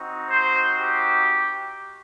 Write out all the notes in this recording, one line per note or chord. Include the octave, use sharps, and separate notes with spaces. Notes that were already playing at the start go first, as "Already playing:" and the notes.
Already playing: C4 D#4 F#4
C5
G4